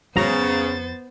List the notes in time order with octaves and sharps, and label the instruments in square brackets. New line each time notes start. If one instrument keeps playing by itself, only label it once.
[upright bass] F2 [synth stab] G#2 F#3 A#5 [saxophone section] C#3 [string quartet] B3 C5 A6